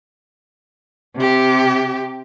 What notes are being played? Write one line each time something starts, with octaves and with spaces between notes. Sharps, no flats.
C3 G4